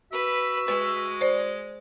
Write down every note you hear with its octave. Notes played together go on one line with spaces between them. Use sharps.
F#4 B4 E5
G#3 B4
C5 D5